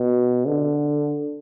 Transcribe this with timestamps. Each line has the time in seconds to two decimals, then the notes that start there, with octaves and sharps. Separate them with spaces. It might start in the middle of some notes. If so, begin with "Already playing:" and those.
Already playing: B2
0.46 D3